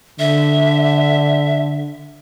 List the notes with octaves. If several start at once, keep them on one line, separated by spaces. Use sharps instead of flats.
D3 E5